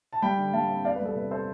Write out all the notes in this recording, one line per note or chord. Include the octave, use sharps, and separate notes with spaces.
A5
G3 G5 B5
D3
G3 F5 A5
C4
E2 D5 F5
B4
G3
A4
C3 B4
A4 C5